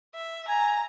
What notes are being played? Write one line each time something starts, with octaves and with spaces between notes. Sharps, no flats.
E5
G#5 A#5